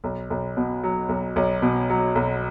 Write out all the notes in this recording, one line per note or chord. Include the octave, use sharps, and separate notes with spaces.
B1
B1
B2
F#3
B1
B1
B2
F#3
B1